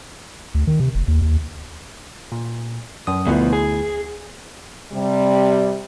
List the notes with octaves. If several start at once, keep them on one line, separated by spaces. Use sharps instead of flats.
D2
D#3
C3
F1
D#2
D#2
A#2
F#2 D#6
D2 B2 F3 B3 E4
G#4
C3 G3